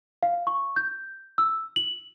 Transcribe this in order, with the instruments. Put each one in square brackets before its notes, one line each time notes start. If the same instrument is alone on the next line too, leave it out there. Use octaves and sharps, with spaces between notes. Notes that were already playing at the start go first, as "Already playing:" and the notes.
[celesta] F5
C#6
G6
E6
F#7